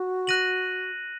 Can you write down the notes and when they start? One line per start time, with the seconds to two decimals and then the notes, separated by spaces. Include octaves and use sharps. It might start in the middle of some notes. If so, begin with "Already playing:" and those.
Already playing: F#4
0.27 F#6 A#6 D#7 F#7